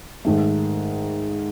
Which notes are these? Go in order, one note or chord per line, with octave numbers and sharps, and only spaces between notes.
G#2 D#3 A3